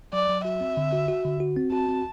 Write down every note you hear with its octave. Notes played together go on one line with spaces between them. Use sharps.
F#3 D5
F#3
F#4 E5
C4
D3
F#4
F#4
D3
F#4
C4
F#4 A5
C4